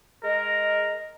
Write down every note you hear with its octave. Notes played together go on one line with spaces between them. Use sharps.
G#3 A#4 D#5